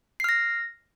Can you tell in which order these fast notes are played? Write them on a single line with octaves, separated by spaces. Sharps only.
C7 F6 A#6